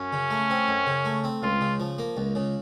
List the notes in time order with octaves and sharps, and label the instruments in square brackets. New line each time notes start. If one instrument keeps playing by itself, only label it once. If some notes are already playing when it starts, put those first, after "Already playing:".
Already playing: [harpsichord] F#2 [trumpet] C#4
[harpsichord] C#3
A3
C4
F#2
C#3
A3
C4
[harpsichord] C#2 [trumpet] F4
[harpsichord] C#3
F3
A#3
C#2
C#3